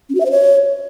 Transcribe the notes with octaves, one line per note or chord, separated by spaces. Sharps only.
C#4
F#4
E5
C5
C#5